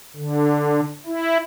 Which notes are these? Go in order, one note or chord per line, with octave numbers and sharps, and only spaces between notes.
D3
E4